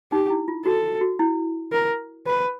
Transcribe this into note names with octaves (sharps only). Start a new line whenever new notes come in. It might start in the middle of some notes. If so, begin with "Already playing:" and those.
D#4 G4
E4
F4
F#4 A4
F#4
E4
A#4
B4